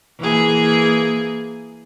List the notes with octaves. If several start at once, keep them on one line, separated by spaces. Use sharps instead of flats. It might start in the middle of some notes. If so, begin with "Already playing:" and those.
E3 A#3 G#4